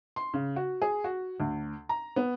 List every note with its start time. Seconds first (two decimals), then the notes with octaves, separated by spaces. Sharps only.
0.16 C6
0.34 C#3
0.56 F#4
0.82 G#4
1.04 F#4
1.40 D2
1.89 A#5
2.16 B3